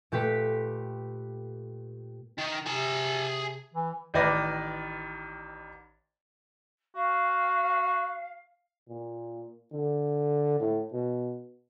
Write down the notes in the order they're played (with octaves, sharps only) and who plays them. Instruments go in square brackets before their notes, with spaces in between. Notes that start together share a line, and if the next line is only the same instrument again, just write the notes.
[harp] A#2 A3 G4 B4 B6
[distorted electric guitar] D#3
[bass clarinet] C3 [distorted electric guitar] G#4 A5
[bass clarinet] E3
[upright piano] A1 D#3 B4 D5 A#6
[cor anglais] F#4 [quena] F5
[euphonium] A#2
D3
A2
B2